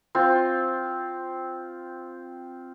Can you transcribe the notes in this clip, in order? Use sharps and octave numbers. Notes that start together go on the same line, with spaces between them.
C4 F4